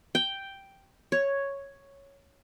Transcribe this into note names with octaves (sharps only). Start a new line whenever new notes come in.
G5
C#5